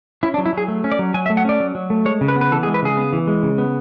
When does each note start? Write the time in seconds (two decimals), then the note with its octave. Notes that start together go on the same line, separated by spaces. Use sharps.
0.23 C#4 E4
0.34 D4
0.38 F#3
0.46 E4
0.53 F#3 G#4
0.68 A3
0.84 C#4
0.92 D5
0.99 F#3
1.14 F#3 G#5
1.26 E5
1.30 A3
1.37 F#5
1.45 C#4 D5
1.60 F#3
1.75 F#3
1.90 A3
2.05 G#3 C#5
2.21 C#3
2.28 B4
2.36 B3
2.41 B4
2.51 E3 A4
2.63 G#4
2.67 G#3
2.74 B4
2.82 C#3 G#4
2.97 B3
3.13 E3
3.27 G#3
3.43 C#3
3.58 B3